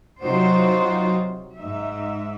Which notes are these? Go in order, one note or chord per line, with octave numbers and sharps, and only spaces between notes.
C3 F#3 D#4 F4 F#4 C5
G#2 D#4 E5